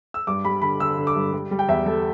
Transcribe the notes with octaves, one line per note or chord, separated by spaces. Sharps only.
E6
G2 D6
G3 B5
D3 B5
D3 E6
D3
D6
G2
G3
G3
G5
E2 E5
G3 A4